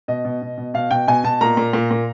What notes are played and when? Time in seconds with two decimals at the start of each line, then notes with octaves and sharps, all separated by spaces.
0.08 B2 D#5
0.25 B2
0.42 B2
0.58 B2
0.74 B2 F5
0.91 B2 G5
1.08 B2 G#5
1.24 B2 A5
1.41 A#2 A#5
1.57 A#2
1.73 A#2
1.91 A#2